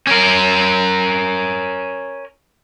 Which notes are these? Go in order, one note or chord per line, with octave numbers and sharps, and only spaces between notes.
C#4 A#4